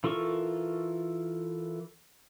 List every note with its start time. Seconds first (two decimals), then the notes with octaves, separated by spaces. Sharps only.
0.04 E3 F4 A4 A#4 C#6